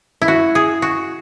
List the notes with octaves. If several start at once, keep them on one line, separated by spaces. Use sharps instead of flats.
E4
F#4
G#4
F#4